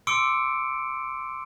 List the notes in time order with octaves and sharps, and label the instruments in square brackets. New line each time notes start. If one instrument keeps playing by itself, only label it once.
[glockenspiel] C6 D6 E6 C#7 D7